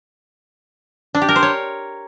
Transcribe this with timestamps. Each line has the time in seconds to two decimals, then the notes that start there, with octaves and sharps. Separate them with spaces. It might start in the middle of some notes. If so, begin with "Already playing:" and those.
1.15 D4
1.22 G4
1.29 A#4
1.36 C5
1.43 C#5